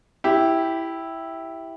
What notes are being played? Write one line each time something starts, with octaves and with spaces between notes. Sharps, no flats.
E4 G4